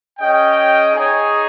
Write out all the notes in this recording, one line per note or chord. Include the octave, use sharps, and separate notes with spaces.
C#4 G#4 D#5 G5
D#4 G#4 C#5